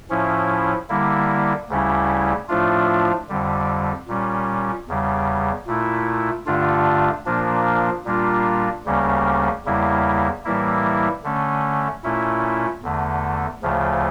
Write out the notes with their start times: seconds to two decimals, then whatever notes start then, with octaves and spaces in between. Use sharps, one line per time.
0.10 A2 F3 C#4 E4
0.89 D3 G3 A#3 E4
1.69 D2 C#3 G3 C#4 E4
2.48 A2 F3 A3 D4 F4
3.29 F2 D3 G3
4.08 A#2 G3 C#4
4.88 E2 C#3 G3
5.67 A#2 A3 E4
6.46 G2 D3 A3 D4 F4
7.26 A#2 F3 A#3 D4
8.05 A#2 G3 A#3 D4 F4
8.85 D2 C#3 G3 A#3 C#4
9.65 E2 C#3 G3 A#3 E4
10.45 A2 E3 G3 A#3 E4
11.24 D3 A3 C#4
12.04 A#2 A3 C#4 E4
12.83 E2 D3 A3
13.62 D2 C#3 F3 A3